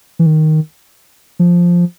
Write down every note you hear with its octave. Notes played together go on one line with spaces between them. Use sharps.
E3
D#3
F3